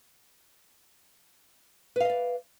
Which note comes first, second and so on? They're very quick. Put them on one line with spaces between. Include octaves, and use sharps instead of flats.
B4 F5 D#5 D5